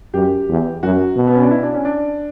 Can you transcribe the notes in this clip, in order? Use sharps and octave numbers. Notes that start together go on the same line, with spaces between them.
F#2 G4
E2
F#2 F#4
B2
B3
C#4
D4
E4
D4
C#4
D4